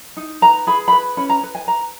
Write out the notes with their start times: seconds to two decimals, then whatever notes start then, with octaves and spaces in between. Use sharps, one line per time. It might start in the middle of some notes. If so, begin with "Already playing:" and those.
0.17 D#4
0.42 B4 A#5
0.67 G#4 B5
0.88 B5
0.92 B4
1.17 C#4 B5
1.30 A#5
1.43 B4
1.55 G#5
1.67 B4 A#5